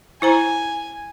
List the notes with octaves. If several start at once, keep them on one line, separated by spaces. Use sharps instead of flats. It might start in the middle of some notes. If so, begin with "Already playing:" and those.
E4 C5 G#5 A#5